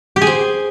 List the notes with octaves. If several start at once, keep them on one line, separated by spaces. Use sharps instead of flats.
G4
G#4
C5